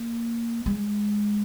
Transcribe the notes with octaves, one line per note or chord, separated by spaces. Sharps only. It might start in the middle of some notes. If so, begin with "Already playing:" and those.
Already playing: A#3
G#3